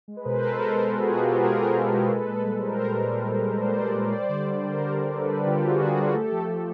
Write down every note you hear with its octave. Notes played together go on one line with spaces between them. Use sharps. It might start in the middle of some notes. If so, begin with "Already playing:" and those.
G#3
B4
B2 A#4 C5
G#3 A4 B4
G#3 A#4 C5
G#3
B2 F#4 G#4
G#3 F4 G4
G#3 F#4 G#4
B2 G#4 A#4
B2
B2
G#3
A#2 A4 B4
A#2
G3
G3 A#4 C5
G3
G3
G3
A#2
G3
A#2 C5 D5
G3
A#2
C#5
G3 C5 D5
D3
G3
G3 A#4 C5
D3
D3
G3 A4 B4
G3 G4 A4
D3 F4 G4
D3 F#4 G#4
D3
F#4 G#4
G3
A#4
A3 G4 A4
F3
F3